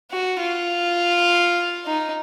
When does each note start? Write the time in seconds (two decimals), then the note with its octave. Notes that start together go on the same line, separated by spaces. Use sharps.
0.11 F#4
0.40 F4
1.86 D#4